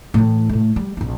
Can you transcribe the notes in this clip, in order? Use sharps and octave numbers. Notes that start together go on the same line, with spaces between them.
A2 E3
A2 A3
G3
A#1 C4